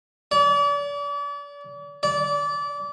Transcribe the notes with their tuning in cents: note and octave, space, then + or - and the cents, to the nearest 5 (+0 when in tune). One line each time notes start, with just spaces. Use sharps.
D5 -40
D5 -25